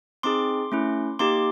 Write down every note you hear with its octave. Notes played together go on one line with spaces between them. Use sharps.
C4 D#4 G#4 C6 D6
A3 C#4 E4
A#3 D#4 G4 C6 D6